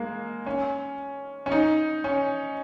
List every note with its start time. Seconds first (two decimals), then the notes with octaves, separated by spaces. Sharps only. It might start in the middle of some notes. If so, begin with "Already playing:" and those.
Already playing: G#3 A#3
0.46 C#4
1.46 C#4
1.52 D#4
2.04 C#4